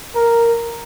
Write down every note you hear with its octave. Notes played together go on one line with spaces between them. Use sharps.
A#4